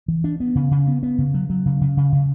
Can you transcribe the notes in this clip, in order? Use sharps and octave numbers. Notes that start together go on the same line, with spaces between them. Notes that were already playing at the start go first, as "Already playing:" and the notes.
E3
D4
B3
C#3
C#3
B3
B3
C#3
F#3
F#3
C#3
C#3
C#3
C#3